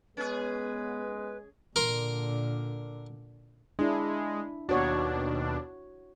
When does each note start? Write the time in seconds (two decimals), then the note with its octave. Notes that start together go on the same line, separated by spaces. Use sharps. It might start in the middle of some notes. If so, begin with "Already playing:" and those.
0.17 G#3 B3 C#4 G#4 B4
1.76 A#2 D3 A#4 C6
3.79 G#3 D4 E4
4.69 D#2 B2 D4 F#4 C#5